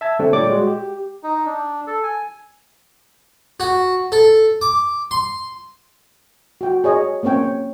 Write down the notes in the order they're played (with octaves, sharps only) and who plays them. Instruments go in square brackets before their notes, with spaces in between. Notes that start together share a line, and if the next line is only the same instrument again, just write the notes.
[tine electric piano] E5 A5 G#6
D3 G3 A3 C4 D4
A#2 G3 G4 C#5 D5 D6
G#3 F#4
G4
[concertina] D#4
D4
A4
G#5
[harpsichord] F#4
A4
D6
C6
[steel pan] F#4 G5
G#4 C#5 D#5
A#3 C4 C#4 C#5 G5